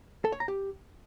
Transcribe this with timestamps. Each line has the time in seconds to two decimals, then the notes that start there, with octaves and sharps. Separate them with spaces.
0.25 A4
0.32 C#5
0.40 A#5
0.48 G4